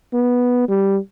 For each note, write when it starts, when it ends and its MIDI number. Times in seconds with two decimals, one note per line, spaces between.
0.14 0.66 59
0.69 0.97 55